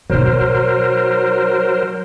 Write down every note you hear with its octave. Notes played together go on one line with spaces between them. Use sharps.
B2 F#3 D#4 A#4 C5